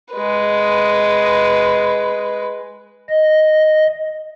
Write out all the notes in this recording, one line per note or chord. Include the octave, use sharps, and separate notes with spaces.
G#3 B4
D#5